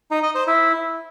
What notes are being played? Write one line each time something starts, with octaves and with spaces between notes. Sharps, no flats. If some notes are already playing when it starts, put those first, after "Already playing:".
D#4
D#5
C5
E4